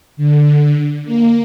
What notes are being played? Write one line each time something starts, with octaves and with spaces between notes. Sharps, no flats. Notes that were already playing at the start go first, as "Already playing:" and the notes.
D3
A#3